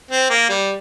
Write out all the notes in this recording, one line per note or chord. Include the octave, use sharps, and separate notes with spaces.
C4
A#3
G3